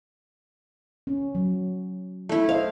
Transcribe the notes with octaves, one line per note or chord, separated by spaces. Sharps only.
C#4
F#3
A3 E4
C5 D#5 F5